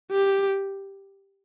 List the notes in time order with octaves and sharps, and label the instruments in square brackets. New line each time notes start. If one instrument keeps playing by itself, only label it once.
[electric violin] G4